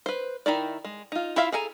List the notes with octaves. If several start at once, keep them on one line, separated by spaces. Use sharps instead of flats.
B4 C5
D#3 D#4 E4 D5
G#3
D#4 F4
E4 F4 E5 F5
G#4 A4 G#5 A#5